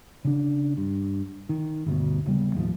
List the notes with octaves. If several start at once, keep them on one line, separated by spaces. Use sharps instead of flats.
C#3 D4
G2
D#3
G1 D2 B2
D#1 C#3 G3 B3
D#2 A2 F3